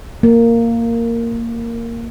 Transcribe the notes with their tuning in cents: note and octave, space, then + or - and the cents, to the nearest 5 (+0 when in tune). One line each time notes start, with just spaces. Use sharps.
A#3 -10